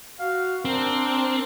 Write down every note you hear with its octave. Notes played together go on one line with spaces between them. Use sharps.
F#4 F5
C4 D4 A#4